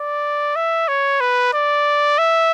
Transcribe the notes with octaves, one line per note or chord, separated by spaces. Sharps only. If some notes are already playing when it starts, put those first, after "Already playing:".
Already playing: D5
E5
C#5
B4
D5
E5